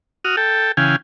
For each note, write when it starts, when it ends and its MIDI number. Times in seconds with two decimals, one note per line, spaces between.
0.24 0.36 66
0.24 0.36 87
0.24 0.36 89
0.37 0.72 69
0.37 0.72 79
0.77 0.96 49
0.77 0.96 52
0.77 0.96 77
0.77 0.96 79
0.77 0.96 80